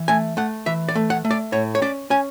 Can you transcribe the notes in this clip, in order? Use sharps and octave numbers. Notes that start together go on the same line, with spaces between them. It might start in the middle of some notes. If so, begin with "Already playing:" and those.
Already playing: E3
A3 G#5
A3 F#5
E3 E5
D5
A3
F#5
A3
D5
A2 C#5
C#5
C#4 D5
C#4 G#5